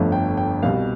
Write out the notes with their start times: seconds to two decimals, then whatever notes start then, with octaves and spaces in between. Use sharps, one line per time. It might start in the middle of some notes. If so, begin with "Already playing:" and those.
Already playing: G1 F2 D3 F3 A3
0.12 G5
0.37 G5
0.63 C2 B2 G3 F5